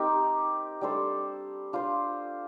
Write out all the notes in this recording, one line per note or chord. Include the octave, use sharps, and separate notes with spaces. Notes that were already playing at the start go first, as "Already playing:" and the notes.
Already playing: C4 D#4 G4 A#4
G3 D4 A4 C5
D4 F4 C5